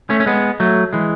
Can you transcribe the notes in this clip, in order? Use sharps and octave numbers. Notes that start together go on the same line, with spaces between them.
A3 C#4
C#4
G#3 B3
F#3 A3
E3 G#3